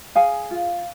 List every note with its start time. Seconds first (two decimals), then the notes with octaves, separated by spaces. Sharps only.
0.15 G#4 F5 G#5
0.51 F4